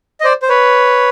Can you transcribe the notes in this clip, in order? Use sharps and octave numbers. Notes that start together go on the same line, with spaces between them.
D#5
C5 D5
C5
B4 C#5